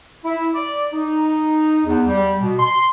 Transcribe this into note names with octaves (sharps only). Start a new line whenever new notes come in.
E4
D5
D#4
E2
G3
B2
C6